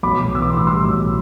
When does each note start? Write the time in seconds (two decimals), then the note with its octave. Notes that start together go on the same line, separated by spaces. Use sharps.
0.03 B1 B5 D6
0.19 B1
0.35 E3 E6
0.42 D6
0.50 A2 C6
0.57 B5 D6
0.67 G3 C6 E6
0.83 B1